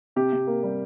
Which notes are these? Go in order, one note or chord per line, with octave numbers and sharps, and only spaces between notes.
C3 G4
C3
A#3
G3